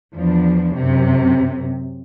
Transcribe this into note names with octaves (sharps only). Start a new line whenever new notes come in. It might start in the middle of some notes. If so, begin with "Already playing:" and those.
E2 F3 D4
F#2 C3